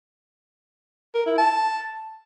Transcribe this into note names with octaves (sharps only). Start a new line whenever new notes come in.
A#4
E4
A5